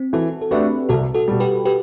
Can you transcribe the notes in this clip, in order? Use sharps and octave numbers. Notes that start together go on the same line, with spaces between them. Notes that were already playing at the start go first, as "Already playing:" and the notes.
Already playing: C4
E3 F#4 A4
A4
A3 D4 F#4 G4 B4
C2 F#4 A4
F#4 A4
B2 G3
G4 B4
G4 B4